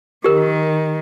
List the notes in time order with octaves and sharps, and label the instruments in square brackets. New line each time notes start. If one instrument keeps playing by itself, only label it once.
[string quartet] D#3 [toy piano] G4 A#4